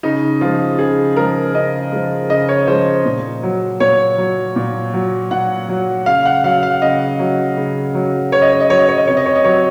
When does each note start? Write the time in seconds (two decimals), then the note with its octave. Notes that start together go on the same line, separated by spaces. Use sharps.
0.03 C#3 D#4
0.41 F3 G#3 F4
0.79 C#3 G#4
1.16 F3 G#3 A#4
1.54 C#3 D#5
1.92 F3 G#3
2.29 C#3 D#5
2.49 C#5
2.67 F3 G#3 C5
3.05 A#2
3.43 F#3
3.80 A#2 C#5
4.18 F#3
4.56 A#2
4.94 F#3
5.31 A#2 F#5
5.69 F#3
6.06 C#3 F5
6.25 F#5
6.44 F#3 F5
6.63 F5
6.82 C#3 D#5
7.19 F#3
7.57 C#3
7.95 F#3
8.32 C#3 C#5
8.42 D#5
8.51 C#5
8.60 D#5
8.69 F#3 C#5
8.79 D#5
8.89 C#5
8.98 D#5
9.07 C3 C#5
9.17 D#5
9.26 C#5
9.35 D#5
9.44 F#3 C#5